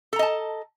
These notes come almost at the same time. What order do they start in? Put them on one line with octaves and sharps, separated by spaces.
A4 A#5 D#5 A5